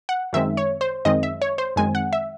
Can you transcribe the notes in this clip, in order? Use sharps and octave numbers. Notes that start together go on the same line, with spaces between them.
F#5
F#2 D#3 G#3 C4 E5
C#5
C5
F#2 D#3 G#3 C4 D#5
E5
C#5
C5
F#2 D#3 G#3 C4 G#5
F#5
E5